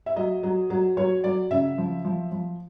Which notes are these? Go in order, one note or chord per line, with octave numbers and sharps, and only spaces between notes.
E5
F#3 D#5
F#3
F#3
F#3 C#5
F#3 D5
C#3 E5
F3
F3
F3